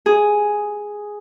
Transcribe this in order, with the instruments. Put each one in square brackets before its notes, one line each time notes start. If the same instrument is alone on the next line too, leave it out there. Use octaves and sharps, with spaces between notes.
[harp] G#4